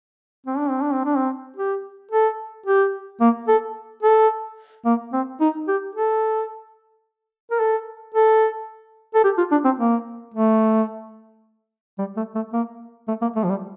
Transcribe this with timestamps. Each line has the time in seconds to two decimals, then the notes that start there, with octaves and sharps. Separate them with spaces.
0.46 C4
0.58 D4
0.70 C4
0.82 D4
0.94 C4
1.05 D4
1.17 C4
1.57 G4
2.11 A4
2.66 G4
3.21 A#3
3.48 A4
4.03 A4
4.85 A#3
5.13 C4
5.40 D#4
5.68 G4
5.95 A4
7.51 A#4
7.60 A4
8.15 A4
9.15 A4
9.24 G4
9.38 F4
9.51 D4
9.65 C4
9.79 A#3
10.34 A3
11.99 G3
12.17 A3
12.35 A3
12.53 A#3
13.08 A3
13.22 A#3
13.36 A3
13.44 F3
13.50 G3